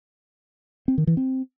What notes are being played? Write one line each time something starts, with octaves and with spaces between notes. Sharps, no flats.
C4
D#3
E3
C4